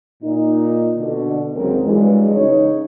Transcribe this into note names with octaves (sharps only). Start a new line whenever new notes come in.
A#2 D#4
B2 D3
D#2 G#2 C#3 F#3 C4 A#4
G2 E3 F#3 G#3
C#3 D#4 C#5